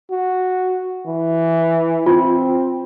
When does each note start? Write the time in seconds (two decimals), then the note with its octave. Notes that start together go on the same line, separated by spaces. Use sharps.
0.11 F#4
1.06 E3
2.06 C4 F4